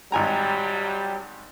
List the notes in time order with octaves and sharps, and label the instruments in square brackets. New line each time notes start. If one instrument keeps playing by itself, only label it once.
[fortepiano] G#1 G#5 A#5 [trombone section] F#3 G3